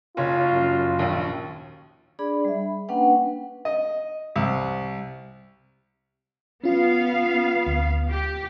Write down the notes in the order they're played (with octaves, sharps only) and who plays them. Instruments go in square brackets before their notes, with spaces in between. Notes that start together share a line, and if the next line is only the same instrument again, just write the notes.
[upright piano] F#1 C#5 [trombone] F4
[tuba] F#2
[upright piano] A#1 D#2
[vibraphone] D4 G#4 D5 B5
G3 E5
B5
A#3 C#4 D4 B4 F#5 G5
[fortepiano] D#5
C2
[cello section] B3 F5 [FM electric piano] C#4 F4
[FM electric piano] D2
[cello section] G4